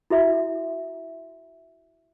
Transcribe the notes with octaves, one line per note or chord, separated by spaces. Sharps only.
E4 F#4 E5